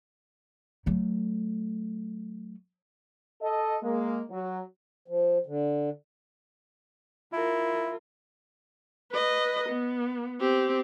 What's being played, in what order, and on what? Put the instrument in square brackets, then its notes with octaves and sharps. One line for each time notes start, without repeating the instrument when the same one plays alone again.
[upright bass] F#3 A3
[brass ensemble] A4 D#5
G#3 A#3
F#3
[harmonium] F3
D3
[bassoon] E4 [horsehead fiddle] F4 A#4
[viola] B4 D#5
B3
C4 G4